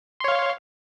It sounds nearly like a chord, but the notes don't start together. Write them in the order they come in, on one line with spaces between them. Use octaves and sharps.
C6 C#5 F5